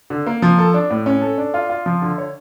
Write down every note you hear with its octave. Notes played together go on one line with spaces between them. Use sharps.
D3
A#3
F3
A4
D4
A2
C#4
A4
D4
F4
F4
F3
D3
C#5